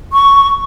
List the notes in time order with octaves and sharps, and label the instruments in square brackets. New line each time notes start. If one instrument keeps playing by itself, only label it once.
[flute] C#6